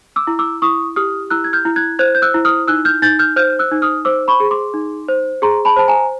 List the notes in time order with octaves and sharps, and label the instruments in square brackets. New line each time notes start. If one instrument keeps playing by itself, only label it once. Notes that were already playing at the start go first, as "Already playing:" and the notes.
[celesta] D6 E6
E4
D6 E6
E4 C#6 D#6
G4 D#6 F6
E4 E6 F#6
G#6
F6 G6
E4
F#6 G#6
C5 F#6 G#6
G6
E6 F#6
E4
D#6 F6
D#4 E6 F#6
F6 G6
D#4 G6 A6
F6 G6
C5 F6 G6
E6 F#6
D#4
D#6 F6
C5 D6 E6
B5 C#6
G#4
C6 D6
D#4
C5
G#4 A#5 C6
A5 B5
C5 A5
G#5 A#5